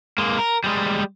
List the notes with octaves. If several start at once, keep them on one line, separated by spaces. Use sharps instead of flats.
G#3 A#3
A#4
G3 G#3